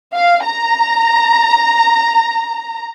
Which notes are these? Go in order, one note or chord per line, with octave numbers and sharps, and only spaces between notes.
F5
A#5